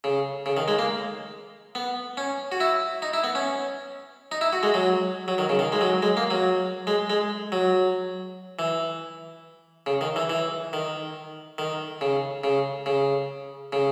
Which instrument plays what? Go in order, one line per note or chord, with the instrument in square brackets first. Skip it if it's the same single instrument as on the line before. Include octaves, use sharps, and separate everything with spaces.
[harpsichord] C#3
C#3
D#3
G#3
A#3
B3
C#4
F#4
E4
D#4
E4
B3
C#4
D#4
E4
F#4
G#3
F#3
F#3
D#3
C#3
D#3
G#3
F#3
G#3
A#3
F#3
G#3
G#3
F#3
E3
C#3
D#3
E3
E3
D#3
D#3
C#3
C#3
C#3
C#3